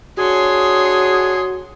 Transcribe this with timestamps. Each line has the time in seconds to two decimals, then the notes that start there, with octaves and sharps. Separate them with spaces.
0.19 D4 F#4 G#4 C#5 C6